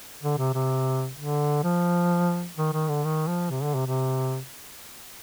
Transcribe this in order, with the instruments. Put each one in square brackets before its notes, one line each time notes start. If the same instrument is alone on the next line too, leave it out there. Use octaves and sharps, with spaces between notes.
[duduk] D3
C3
C3
D3
F3
D#3
D#3
D3
D#3
F3
C3
D3
C3
C3